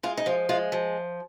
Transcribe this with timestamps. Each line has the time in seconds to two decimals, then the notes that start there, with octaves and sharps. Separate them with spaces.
0.03 G#3 F4
0.17 D#4
0.26 F3 F4
0.49 G#3 F4
0.72 F3